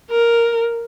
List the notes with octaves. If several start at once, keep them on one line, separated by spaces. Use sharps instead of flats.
A#4